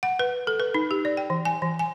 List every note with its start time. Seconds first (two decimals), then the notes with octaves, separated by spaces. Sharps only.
0.03 F#5
0.19 B4
0.47 A4
0.60 B4
0.74 D#4
0.91 G4
1.05 D5
1.17 G5
1.30 E3
1.45 G#5
1.62 E3
1.79 G#5